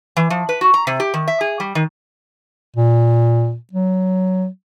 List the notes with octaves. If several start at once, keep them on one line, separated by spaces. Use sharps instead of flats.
E3
F3
B4
F#4
A#5
C3
G4
D#3
E5
G#4
G3
D#3
A#2
F#3